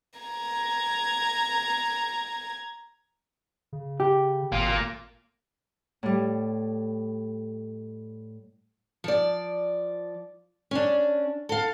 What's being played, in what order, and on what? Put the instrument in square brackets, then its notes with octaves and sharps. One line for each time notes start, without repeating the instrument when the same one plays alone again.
[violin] A#5 G#6
[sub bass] C#3
[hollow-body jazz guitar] G4
[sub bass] G#1 [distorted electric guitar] A#3 F4
[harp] A2 G3
[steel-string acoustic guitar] F3 D5
C#4 D4
A4 F5